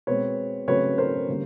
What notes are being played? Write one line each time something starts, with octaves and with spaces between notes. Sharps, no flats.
B2 G#3 C4 B4 C#5
C#3 F#3 A3 C4 B4 C#5
A#4 C5
D3 G3 A#3 C#4